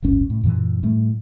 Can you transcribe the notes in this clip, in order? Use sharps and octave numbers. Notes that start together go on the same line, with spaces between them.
D1 G1 G2 C#4
A2
F#2 A#2 D#3 E3
A2 G3 A3